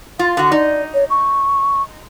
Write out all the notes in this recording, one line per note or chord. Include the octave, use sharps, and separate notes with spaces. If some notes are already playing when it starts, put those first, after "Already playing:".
F4 F5
D3 F#4
D#4 D5
C#5
C#6